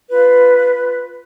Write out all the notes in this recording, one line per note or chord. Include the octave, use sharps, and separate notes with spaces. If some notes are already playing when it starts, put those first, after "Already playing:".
F4 B4